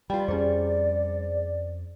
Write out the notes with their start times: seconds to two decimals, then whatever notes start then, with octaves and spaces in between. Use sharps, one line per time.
0.10 G3 F4 B4 G5 B5
0.28 F2 C#4 G#4 C5 D5